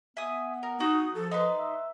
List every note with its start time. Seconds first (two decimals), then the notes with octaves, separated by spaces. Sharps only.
0.17 B3 E5 G#5 D#6
0.63 A#4
0.80 D#4 F#4 D#6
1.15 F3 A4
1.31 D#4 B4 C6
1.57 E5